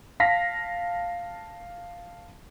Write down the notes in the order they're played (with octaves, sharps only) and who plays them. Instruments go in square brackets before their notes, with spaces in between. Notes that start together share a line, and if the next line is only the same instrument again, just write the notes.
[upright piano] F5 A5 A#6 B6